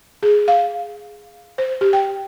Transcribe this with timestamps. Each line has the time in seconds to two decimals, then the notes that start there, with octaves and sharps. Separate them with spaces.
0.23 G#4
0.48 F5
1.58 C5
1.81 G4
1.93 G5